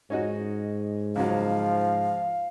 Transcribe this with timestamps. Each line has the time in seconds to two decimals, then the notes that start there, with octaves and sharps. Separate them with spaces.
0.10 G#2 C#4 D#4 F#4
1.16 C#2 F#2 F3 F#3 F5